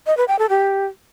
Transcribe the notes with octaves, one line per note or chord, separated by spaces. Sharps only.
D#5
B4
G5
A4
G4